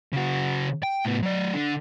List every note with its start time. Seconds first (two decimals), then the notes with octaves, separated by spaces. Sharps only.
0.13 C#3 F#4
0.83 G5
1.05 A2 B3
1.22 F#3 D5
1.54 D3